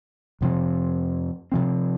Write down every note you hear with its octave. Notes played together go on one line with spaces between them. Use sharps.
F2 C3 F3 C4
C3 F3 C4